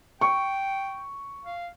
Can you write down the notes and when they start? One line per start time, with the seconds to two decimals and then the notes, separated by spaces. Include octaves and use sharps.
0.21 G5 C#6
1.45 F5